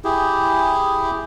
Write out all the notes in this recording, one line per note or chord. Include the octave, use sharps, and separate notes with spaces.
E4 G4 G#4